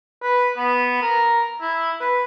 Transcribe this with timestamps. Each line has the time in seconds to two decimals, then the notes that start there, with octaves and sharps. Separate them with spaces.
0.22 B4
0.57 B3
1.02 A#4
1.61 E4
2.01 B4